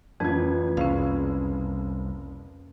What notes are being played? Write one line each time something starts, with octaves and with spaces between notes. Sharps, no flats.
A1 F2 C#3 F4 B4 G#6
F#1 C2 C#4 F5